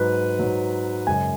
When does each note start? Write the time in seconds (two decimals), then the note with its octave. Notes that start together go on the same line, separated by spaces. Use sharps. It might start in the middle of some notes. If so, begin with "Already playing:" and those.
Already playing: G#2 F#3 B4
0.39 G#2 F#3
1.07 F#2 C#3 G#3 G#5